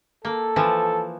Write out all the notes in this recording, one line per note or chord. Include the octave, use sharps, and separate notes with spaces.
A#3 A4
E3 F3